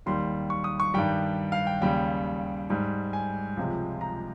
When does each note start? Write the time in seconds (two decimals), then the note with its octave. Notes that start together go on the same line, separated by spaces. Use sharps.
0.06 D#2 D#3 G3 C6
0.50 C#6
0.64 D#6
0.80 C#6
0.94 G2 D#3 G3 G5
1.52 F5
1.67 G5
1.81 D#2 C#3 G3 G5
2.70 G#2 G3
3.13 G#5
3.57 C#2 C3 F3 G#3
4.01 A#5